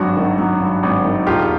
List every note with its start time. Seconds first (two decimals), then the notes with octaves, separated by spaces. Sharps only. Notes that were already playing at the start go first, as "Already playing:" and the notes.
Already playing: G#1 G2 F#3 F#4
0.17 D#3
0.39 F#3
0.60 G2
0.83 G#1
1.05 D#3
1.27 E1 F4 G4